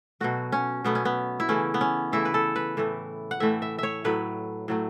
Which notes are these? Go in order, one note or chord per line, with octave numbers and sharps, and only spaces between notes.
B2 F#3 A3 F#4
C#4
B2 F#3 A3 B3
C#4
B3
E4
C#3 E3 A3 C#4
B3
C#4
C#3 E3 A3 E4
B4
A4
B4
A2 E3 A3
F#5
A2 E3 A3 E5
E5
C#5 E5
A2 F#3 A3 B4
A2 F#3 A3